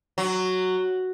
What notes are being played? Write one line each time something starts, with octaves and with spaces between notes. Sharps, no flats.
F#3